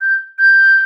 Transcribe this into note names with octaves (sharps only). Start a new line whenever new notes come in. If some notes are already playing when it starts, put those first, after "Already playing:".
G6
G6